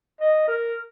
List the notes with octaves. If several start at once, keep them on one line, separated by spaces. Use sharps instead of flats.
D#5
A#4